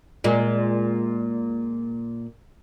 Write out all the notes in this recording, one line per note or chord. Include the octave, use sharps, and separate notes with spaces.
A#2 G#3